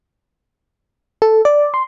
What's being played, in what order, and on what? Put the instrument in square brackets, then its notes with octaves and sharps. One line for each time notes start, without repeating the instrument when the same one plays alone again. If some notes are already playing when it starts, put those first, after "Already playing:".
[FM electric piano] A4
D5
C6